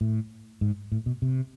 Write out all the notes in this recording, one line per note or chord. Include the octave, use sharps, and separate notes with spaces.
A2
G#2
A2
B2
C3